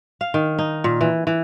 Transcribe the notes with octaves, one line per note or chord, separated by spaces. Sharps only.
F5
D#3
D#4
A#2
E3
E3